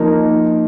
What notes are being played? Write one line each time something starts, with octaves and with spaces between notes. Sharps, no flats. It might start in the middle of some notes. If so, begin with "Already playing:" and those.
Already playing: F3 A#3 D#4 A#4